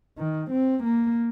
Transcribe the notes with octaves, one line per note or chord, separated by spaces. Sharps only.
D#3
C4
A#3